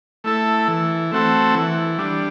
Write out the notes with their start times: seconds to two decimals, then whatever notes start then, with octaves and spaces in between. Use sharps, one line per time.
0.24 A3 E4 A4
0.68 E3
1.12 A3 C4 F#4 A4
1.55 E3
1.98 G3 D4